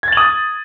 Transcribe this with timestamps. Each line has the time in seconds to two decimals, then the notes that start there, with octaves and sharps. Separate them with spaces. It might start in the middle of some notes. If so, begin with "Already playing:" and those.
0.03 G#6
0.08 A6
0.13 F#7
0.17 D#6